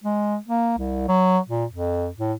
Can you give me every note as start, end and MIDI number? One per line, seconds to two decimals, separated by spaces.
0.04 0.37 56
0.48 0.74 58
0.78 1.07 36
1.08 1.38 54
1.49 1.65 46
1.71 2.08 41
2.18 2.33 45